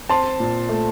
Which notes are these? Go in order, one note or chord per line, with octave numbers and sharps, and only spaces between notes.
C4 A5 C6
A#2
A3